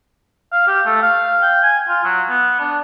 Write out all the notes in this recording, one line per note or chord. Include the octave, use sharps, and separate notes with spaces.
F5
G4
A3
F5
G5
G#5
F4
F#3
B3
D4